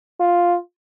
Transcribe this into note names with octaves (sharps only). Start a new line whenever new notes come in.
F4